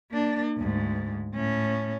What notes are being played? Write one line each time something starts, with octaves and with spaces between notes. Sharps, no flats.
A#3 D4
D2 G#2
A2 C#4